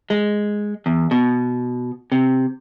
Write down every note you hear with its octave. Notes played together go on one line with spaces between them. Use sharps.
G#3
E2
B2
C3